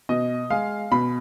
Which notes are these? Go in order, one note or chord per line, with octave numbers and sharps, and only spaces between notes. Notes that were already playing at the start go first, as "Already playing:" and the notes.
B2 D#5
G#3 F5
B2 B5